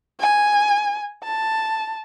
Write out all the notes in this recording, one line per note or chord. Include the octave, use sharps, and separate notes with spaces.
G#5
A5